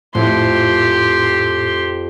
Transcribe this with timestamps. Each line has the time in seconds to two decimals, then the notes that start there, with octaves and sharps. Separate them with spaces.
0.15 F2 A2 E4 G4 C6